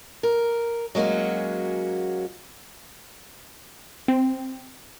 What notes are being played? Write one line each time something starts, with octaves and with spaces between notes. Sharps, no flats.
A#4
F#3 G#3 A#3 C#4 F#4
C4